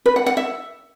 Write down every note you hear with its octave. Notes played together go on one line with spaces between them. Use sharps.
B4
F#5
F#5
E5